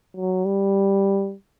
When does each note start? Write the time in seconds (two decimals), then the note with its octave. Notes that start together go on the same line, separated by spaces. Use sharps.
0.16 F#3
0.45 G3